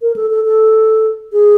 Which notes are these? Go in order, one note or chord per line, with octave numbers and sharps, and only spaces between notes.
A#4
A4
A4
A4
G#4